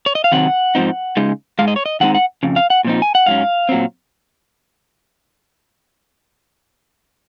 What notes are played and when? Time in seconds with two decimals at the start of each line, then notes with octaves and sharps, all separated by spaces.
0.06 C#5
0.15 D#5
0.24 F5
0.32 C3 D#3 F#3 C4 F#5
0.75 G#2 F3 C4 D#4
1.17 C#3 G#3 D#4
1.59 G#2 F3 G#3 F5
1.68 D#5
1.76 C#5
1.86 D#5
2.00 D#3 G#3 C4 D#4 F#5
2.15 F#5
2.43 F2 C#3
2.56 F5
2.70 F#5
2.85 A#2 F3 C4 D#4
3.02 G#5
3.15 F#5
3.26 G#2 F#3 C#4 F5
3.69 A#2 F#3 C4